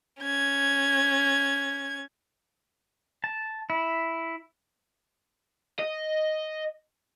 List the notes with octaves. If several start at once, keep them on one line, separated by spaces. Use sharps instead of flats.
C#4 G#6
A5
E4
D#5